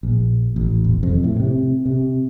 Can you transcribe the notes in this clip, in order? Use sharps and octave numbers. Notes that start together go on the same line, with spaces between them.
A#1
A1
E1
F2
A2
C3
C3